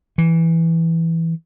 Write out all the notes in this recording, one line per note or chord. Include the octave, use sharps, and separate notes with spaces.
E3